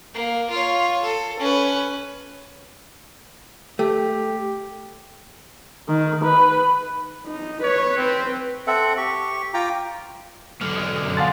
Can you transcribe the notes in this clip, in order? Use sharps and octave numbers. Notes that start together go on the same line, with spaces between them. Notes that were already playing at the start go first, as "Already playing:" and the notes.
A#3
F4 C#5
A4
C#4 B4
A3 G4
D#3
B4
D#4
B4 C#5
C4
C4 A4 E5 F#5
G4 C#6
F4 G5 A#5 D6
B1 D3 F6
D#6 G#6
F#2
F5 F#5 G#5 A5 C6 A6